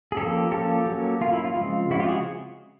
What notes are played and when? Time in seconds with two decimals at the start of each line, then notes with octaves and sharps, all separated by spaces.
0.12 G#4
0.16 F3 A#3 C#4 G4 A4
0.51 F3 A#3 C#4 G4 A4
0.86 F#3 A#3 C#4
1.21 F#3 A#3 C#4 F4
1.33 E4
1.44 F4
1.56 C#3 F3 G#3 C4
1.90 C#3 F3 G#3 C4 E4 F#4
1.99 F4 G4
2.08 F#4 G#4